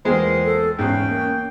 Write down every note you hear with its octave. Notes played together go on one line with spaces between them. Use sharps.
E2 G#3 A#3 F4 A#4 C5 G5
A4
E2 G#2 C#4 G5 C7
A#3